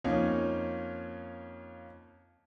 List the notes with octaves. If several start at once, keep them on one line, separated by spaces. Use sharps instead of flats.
F2 A#3 C#4 D#4